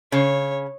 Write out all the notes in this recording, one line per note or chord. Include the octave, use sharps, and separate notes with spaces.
C#3 C#5